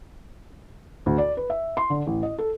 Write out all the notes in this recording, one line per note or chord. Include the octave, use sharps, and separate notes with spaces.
D2
D5
B4
E5
C6
D3
A1
D#5
A4